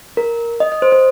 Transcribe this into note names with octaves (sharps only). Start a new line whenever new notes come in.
A#4
D#5
D#5
C5
C5